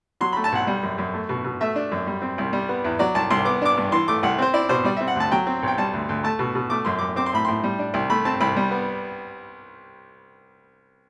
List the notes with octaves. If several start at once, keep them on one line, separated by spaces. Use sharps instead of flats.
F#3 C6
B5
A3
A5
B1 F#5
G3
F#2
F#2
A3
B2
B2
A3 E5
D4
F#2
G3
C4
C2
G3
B3
E2
F#3 D5
C2 A5
C2 C6
B3 D6
D4 D6
G2
E3 C6
A3 D6
C2 F#5
C4 C5
E4 D5
B2 C5
G3 D5
E5
C4
F#5
D2 A5
F#3 G5
C4
B1 G5
G3 A5
D2
D2
A3 A5
B2
B2
A3 D6
F#2 C6
F#2 D6
C4 D6
C6
A2 B5
A2 C6
G3
D4
C2
A3 B5
C4 A5
C2 B5
G3
B3